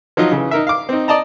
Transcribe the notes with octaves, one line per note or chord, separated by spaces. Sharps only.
F3 F#3 D#4 F4
C#3 E3
D#4 A#4 E5
F5 D6
C4 D#4
D5 D#5 A5 A#5